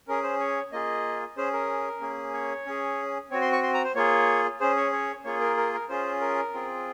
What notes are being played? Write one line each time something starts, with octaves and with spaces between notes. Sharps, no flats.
C#4 G#4 A#4
C5
C#5
A#3 F4 G#4 D#5
C#4 G#4 C5
A#4
A#3 C#4 G#4
C#5
C#4 G#4
C4 F#4 C#5
C6
C#6
C6
A#5
C5
A#3 F4 G#4 C#5
C#4 G#4 C5
C#5
C#5
A#3 F4 G#4 C#5
A#4
A#4
A#4
C#4 F4 G#4 C5
A#4
C4 F4 G#4